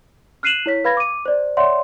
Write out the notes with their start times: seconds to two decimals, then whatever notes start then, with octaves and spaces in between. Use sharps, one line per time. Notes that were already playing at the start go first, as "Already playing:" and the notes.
0.43 F6 F#6 C7 D#7 E7 F#7
0.66 E4 C#5 B6
0.84 B4 F5 B5 G#6 A#6
0.97 D6 D#7
1.26 C5 D5
1.57 C#5 D5 E5 F#5 C6